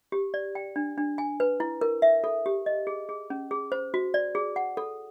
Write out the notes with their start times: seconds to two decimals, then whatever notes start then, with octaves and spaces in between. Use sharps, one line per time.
0.12 G4
0.34 D5
0.55 G5
0.76 D4
0.98 D4
1.18 G#5
1.40 B4
1.60 E4
1.81 A#4
2.02 E5
2.24 A4
2.46 G4
2.66 D#5
2.87 G#4
3.09 G#4
3.30 C#4
3.51 G#4
3.72 C5
3.94 F#4
4.14 D5
4.35 G#4
4.56 F#5
4.77 A4